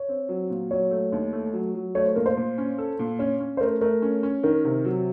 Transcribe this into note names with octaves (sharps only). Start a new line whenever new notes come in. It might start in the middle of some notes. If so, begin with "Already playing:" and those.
Already playing: C#5
C4
F#3
A#2
F#3 C#5
A3
D#2
A3
F#3
F#3
A3 C#5
C5
A#2 A#4
C5
A#2
C#4
A4
A#2
C#4 C#5
C#4
C5
A3 A#4
A3 A#4
C#4
C#4
D#3 A#4
C3
F#3